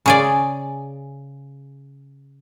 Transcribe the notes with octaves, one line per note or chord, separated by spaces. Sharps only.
C#3 G#4 D5